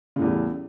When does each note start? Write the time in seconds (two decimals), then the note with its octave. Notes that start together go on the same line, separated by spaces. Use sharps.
0.16 C#3
0.19 A2
0.22 E2
0.25 G3